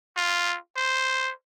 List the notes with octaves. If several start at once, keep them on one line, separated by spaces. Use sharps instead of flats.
F4
C5